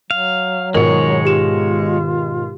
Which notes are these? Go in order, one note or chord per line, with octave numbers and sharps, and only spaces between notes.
F#3 F5
G#2 B2 D#3 G#3 F4 A#4 C#5
F4 G4 E7